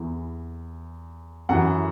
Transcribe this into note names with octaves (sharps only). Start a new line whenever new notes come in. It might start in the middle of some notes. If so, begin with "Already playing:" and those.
Already playing: E2 E3
F#2 E3 F#5